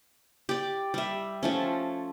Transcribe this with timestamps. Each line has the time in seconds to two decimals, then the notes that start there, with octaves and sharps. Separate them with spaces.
0.49 G4 D5
0.94 G3 E5
1.43 F3 A3 C#4